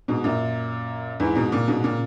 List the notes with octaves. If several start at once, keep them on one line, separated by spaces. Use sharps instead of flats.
G#2 B2
F#2 A#2
E2 G#2
G#2 B2
A#2 C#3
G#2 B2
A#2 C#3